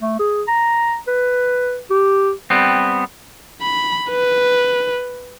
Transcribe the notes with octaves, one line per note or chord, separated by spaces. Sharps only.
A3
G#4
A#5
B4
G4
G3 B3 C4
B5
B4